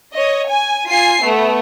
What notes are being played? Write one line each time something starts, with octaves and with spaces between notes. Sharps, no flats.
C#5 D#5
G#5
F4 G#5 C7
A3 B3